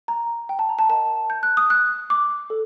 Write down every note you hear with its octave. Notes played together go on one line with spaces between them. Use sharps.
A#5
G5
A5
A#5
A5
A#4 D#5 F#5 A5
G6
F#6
D#6
F#6
D6
A4